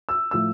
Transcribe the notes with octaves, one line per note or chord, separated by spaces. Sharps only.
E6
A2 F3 E6